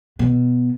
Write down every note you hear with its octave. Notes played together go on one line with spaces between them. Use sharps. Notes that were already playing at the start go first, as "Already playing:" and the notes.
B2